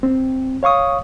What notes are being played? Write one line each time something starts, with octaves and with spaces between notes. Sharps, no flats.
C4
C#5 F5 C#6 D#6